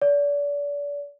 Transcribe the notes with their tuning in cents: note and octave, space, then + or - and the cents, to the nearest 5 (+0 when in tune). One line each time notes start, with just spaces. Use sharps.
D5 -35